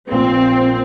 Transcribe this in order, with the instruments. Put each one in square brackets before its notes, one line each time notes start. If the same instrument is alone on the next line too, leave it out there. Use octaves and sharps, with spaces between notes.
[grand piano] A#1 A#2 A#3 [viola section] C4